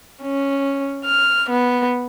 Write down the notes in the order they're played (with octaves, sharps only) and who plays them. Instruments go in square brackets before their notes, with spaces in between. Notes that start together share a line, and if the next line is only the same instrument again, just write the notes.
[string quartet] C#4
F6
B3